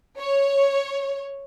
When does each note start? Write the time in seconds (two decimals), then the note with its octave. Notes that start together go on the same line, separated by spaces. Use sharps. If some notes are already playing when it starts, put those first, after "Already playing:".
0.18 C#5